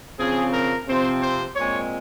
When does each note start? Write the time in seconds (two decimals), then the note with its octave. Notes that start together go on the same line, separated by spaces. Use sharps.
0.19 C#3 F3 C4 G#4
0.53 A#4
0.87 C3 F3 C4 C5
1.21 C5
1.56 A#2 G#3 C4 C#5